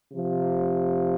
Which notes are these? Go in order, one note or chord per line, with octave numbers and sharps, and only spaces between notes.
C3 F3